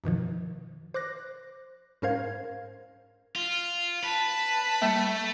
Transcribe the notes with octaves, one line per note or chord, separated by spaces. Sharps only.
F#2 B2 D#3 F3
C5 D6 F#6 A#6
G#2 C#4 A#4 C5 F5 G#6
F4
B4 A5 B6
G3 A3 A#3 E5